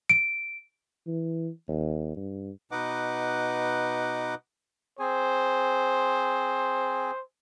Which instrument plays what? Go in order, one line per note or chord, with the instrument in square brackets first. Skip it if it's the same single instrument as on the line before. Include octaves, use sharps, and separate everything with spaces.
[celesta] D7
[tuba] E3
D#2
G2
[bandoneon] B2 D#4 B4 D#5 F#5 D6
[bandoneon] C4 G#4 G#5 [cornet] C5